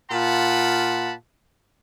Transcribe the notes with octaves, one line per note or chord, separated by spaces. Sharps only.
A#2 F4 F#5 A5 B5